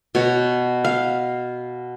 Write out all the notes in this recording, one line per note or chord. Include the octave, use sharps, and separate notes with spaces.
B2 C#5
F5